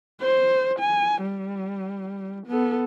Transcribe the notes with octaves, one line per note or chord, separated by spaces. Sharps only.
C5
G#5
G3
B3 A4